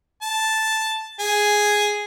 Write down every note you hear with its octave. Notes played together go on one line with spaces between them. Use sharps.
A5
G#4